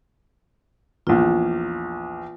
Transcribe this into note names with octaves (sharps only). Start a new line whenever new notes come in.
A#1 E2 F4